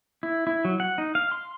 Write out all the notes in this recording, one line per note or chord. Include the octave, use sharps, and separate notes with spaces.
E4
E4
F#3
F#5
D#4
F5
C6